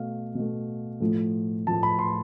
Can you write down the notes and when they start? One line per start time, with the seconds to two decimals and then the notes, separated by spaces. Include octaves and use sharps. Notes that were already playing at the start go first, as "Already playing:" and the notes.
Already playing: B2 A3 F5
0.35 B2 A3
1.00 A2 F3 A3
1.67 A2 F3 A3 A5
1.83 B5
1.99 C6